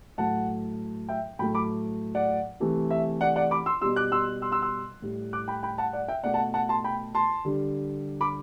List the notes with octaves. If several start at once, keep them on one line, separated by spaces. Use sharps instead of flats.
A2 F#3 A3 F#5 A5
E5 G5
A2 F#3 A3 G5 B5
B5 D6
D5 F#5
C3 E3 A3
E5
D5 F#5
D5 F#5
B5 D6
C6 E6
B2 G3 C6 E6
D6 F#6
C6 E6
C6 E6
C6 E6
C6 E6
A2 G3
D6 F#6
G5 B5
G5 B5
F#5 A5
D5 F#5
E5 G5
B2 A3 D5 F#5
F#5 A5
F#5 A5
A5 C6
G5 B5
A5 C6
D3 G3
B5 D6